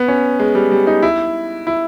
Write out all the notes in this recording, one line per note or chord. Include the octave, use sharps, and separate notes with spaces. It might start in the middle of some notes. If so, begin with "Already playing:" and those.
Already playing: B3
C#4
G#3
G3
G3
D#4
E4
E4